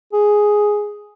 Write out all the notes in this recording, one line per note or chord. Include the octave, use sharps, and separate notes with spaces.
G#4